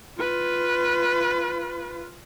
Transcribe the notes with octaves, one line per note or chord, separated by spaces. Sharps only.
F4 B4